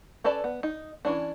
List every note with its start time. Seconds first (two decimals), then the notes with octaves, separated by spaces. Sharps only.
0.24 C#4 A4 B4 D5 A5
0.44 B3
0.63 D#4
1.05 E3 C#4 D4